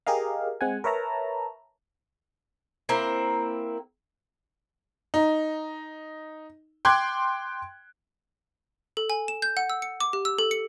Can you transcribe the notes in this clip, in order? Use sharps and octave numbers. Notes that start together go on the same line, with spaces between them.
G4 G#4 A#4 D#5 F5
G#3 C4 F#5 G#5
A#4 B4 C#5 E5 A5 A#5
A#3 C4 E4 A#4
D#4
G5 C6 D6 F#6 G#6
A4
G#5
E7
G6
F#5
E6
C#7
D6
G4
E6
A4
C#7